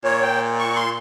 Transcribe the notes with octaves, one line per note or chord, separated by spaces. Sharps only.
A#2 C#5
G5
C#6
C6